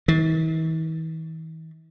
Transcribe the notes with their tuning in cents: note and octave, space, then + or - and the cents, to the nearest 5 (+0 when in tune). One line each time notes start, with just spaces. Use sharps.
E3 -45